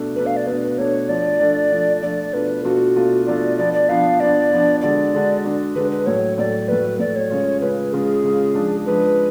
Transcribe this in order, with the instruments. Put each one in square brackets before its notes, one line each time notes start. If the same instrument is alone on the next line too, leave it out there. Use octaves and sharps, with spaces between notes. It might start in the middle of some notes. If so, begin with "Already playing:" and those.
Already playing: [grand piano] B2 A3 D4
[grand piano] B2 A3 D4 [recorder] B4
[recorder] F5
D5
[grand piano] B2 A3 D4 [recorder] B4
[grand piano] B2 A3 D4 [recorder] C#5
[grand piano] F3 A3 D4 [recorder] D5
[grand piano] F3 A3 D4
F3 A3 D4
[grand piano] F3 A3 D4 [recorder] D5
[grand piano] B2 A3 D4 F4 [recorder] B4
[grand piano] B2 A3 D4 F4 [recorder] F#4
[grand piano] B2 A3 D4 F4
[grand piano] B2 A3 D4 F4 [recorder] D5
[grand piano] F3 B3 D4 [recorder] D5
[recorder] D5
[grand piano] F3 B3 D4 [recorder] F5
[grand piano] F3 B3 D4 [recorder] D5
[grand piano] F3 B3 D4
[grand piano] D3 G#3 D4 F#4 [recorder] D5
[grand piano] D3 G#3 D4 F#4
D3 G#3 D4 F#4
[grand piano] D3 G#3 D4 F#4 [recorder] B4
[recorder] B4
[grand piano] A2 F#3 A3 [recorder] C#5
[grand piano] A2 F#3 A3 [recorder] D5
[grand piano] A2 F#3 A3 [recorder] B4
[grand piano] A2 F#3 A3 [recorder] D5
[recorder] C#5
[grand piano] C#3 G#3 C#4 F4
[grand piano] C#3 G#3 C#4 F4 [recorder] B4
[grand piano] C#3 G#3 C#4 F4 [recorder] G#4
[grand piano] C#3 G#3 C#4 F4
F3 G#3 D4
[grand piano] F3 G#3 D4 [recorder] B4